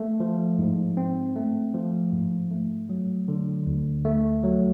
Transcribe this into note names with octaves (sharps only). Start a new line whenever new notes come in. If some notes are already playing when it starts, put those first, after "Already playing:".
Already playing: A3
F3
G#2
C4
A3
F3
G#2
A3
F#3
D3
D2
A3
F#3